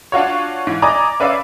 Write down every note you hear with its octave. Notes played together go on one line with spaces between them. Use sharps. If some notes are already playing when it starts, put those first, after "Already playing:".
D4 F4 F#4 C#5
G#2 E3
D5 D#5 G#5 A#5 D6
C#4 B4 D5 E5 F5